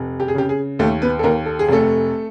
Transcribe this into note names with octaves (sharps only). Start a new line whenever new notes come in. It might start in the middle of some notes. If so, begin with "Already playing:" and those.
Already playing: F1
G4
G#4
C#3 G4
G#4
D#2 A3 A4
B3 B4
A4
D#2 A#3 A#4
A4
G#4
F1 A3 A4